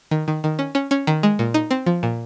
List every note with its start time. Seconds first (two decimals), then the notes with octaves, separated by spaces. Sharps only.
0.11 D#3
0.28 D#3
0.44 D#3
0.59 C#4
0.75 C#4
0.91 C#4
1.07 D#3
1.23 G#3
1.39 A#2
1.54 D#4
1.71 C4
1.86 F3
2.03 A#2